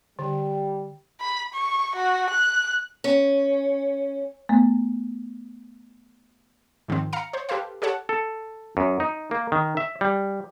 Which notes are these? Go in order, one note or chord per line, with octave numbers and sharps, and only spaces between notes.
D3 G3
B5
C#6
F#4
F#6
C#4
A3 B3
G#2 D#3 F3 C4
F5 A#5 C#7
C5 C#5
G4 A4 B4 C5 F5
G4 A4 C#5 F#5 A5
A4
F#2
D#4
A#3
D#3
E5
G3